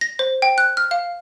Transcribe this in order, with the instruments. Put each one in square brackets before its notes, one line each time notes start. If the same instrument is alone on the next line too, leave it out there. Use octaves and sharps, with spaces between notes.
[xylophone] A#6
C5
G5
F#6
F6
F5